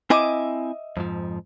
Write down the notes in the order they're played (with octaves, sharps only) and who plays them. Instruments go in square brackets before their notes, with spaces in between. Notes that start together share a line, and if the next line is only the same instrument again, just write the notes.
[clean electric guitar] C4 E4 G#5 [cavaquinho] D#5 E5 D6
[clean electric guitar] F2 G#2 F3